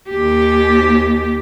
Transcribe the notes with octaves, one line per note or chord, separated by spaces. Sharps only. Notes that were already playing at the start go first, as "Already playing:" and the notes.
D#2 G4